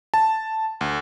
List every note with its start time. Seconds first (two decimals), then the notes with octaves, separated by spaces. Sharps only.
0.14 A5
0.81 D2